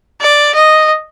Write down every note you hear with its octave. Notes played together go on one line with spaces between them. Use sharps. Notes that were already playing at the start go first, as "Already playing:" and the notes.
D5
D#5